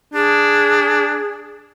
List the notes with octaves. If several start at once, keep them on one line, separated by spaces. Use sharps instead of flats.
D4 G#4